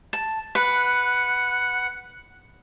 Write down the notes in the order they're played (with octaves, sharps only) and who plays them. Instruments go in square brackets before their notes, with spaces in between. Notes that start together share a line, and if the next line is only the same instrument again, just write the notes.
[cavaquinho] A5
[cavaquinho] B4 [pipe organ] F#5